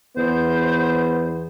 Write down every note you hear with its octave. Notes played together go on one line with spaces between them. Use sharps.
E2 B3 C5